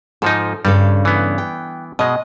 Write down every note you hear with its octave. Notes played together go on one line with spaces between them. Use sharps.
G#2 F3 D#4 A4
G2 C#3 G3 A4
E3 B3
G5
B2 G#3 D#5